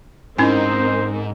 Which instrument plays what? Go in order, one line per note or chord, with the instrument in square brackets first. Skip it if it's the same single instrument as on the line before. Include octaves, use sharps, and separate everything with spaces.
[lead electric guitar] G#2 [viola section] C4 D#4 A#4 [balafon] C#4 E4 G#5 [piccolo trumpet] C5